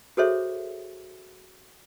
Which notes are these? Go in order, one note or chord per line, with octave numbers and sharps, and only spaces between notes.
F#4 G#4 A4 C5 C#5 E5